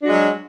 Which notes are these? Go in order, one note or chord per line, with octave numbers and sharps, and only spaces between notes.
F#3 G#3 D4 F#4